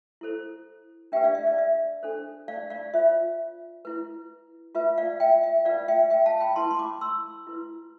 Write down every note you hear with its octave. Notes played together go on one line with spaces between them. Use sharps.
E4 A4 C5
D4 G4 B4 E5 G5
D5 F5
E5
D5
E5
D4 A4 C5
D5 F5
D5 F5
F4 C5 E5
E4 B4
F4 B4 E5
D5 F5
E5 G5
E5
F4 B4 D5 F5
E5 G5
E5 G5
F5 A5
G5 B5
E4 B4 A5 C6
C6
B5 D6
C6 E6
E4 B4